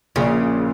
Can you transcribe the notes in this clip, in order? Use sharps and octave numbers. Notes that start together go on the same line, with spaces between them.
A#1 A#2 C#3